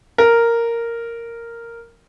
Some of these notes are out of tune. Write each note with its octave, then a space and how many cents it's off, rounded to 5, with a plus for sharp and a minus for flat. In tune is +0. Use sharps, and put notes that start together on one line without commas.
A#4 -5